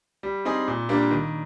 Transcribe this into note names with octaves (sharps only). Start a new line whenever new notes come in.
G3
C4 D#4 G#4
A#2
G3 A#3 D4
D#3